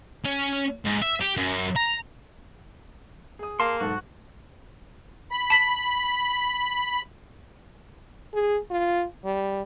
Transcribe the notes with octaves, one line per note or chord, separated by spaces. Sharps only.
C#4
G#2
E5
G4
F#2
A#5
G#4 D#6
A#3 A5 C6
B1 G#2 F#4 A4
B5
A5 B6 F#7
G#4
F4
G3